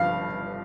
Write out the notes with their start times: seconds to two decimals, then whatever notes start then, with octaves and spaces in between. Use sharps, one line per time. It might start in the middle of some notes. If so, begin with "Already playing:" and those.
Already playing: G1 G2 F3 F5